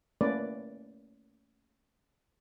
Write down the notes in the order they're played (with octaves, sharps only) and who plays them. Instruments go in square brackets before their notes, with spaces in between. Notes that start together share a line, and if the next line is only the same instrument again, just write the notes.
[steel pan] A3 A#3 C#4 E4 B4 D5